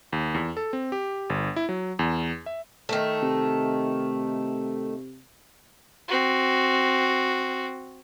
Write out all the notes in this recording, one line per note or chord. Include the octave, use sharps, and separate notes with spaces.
D#2
E2
A4
C4
G4
G1
E4
F#3
E2
E5
D#3 A3
C3
C4 F#4